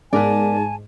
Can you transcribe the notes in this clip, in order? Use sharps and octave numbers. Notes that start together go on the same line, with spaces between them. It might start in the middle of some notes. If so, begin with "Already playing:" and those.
G#2 B3 A#4 D5 G#5 A5